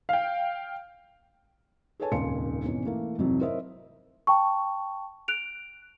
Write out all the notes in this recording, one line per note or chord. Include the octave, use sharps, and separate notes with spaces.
F5 G5
G#4 A4 B4 C#5 G#5 A5
D#1 G#1 C#2 A#3 C6 C#7
G#1 E2 B2 C#4
E3 A3 A#3
G#1 F2 C3 E3 F#3
E4 A#4 C5 C#5 D#5 E5
G5 A5 C#6
F#6 D7 F7